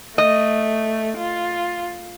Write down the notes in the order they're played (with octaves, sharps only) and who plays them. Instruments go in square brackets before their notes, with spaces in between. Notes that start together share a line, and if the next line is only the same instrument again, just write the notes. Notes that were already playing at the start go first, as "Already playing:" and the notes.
[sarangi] A3 [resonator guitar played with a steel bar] D#5
[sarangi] F4